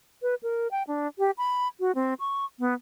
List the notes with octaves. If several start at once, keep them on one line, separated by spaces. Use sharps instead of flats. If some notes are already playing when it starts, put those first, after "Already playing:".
B4
A#4
G5
D4
G4
B5
F#4
C4
C#6
B3